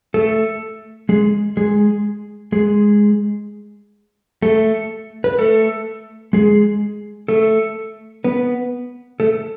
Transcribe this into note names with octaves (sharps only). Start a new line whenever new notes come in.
A3 A4
G#3 G#4
G#3 G#4
G#3 G#4
A3 A4
B4
A3 A4
G#3 G#4
A3 A4
B3 B4
A3 A4